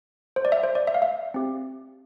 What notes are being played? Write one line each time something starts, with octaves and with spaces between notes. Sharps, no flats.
C5
D5
E5
C5
D5
E5
F5
E5
C4 G4